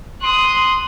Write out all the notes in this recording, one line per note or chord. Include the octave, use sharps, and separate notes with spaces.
C6 D#6 F#6